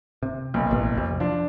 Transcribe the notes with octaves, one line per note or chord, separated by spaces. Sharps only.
C3
F#1 B1
A1 B2
F2 C3
F3 D4